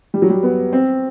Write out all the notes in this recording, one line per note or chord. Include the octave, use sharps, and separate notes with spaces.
G3
F#3
G3
B3
C4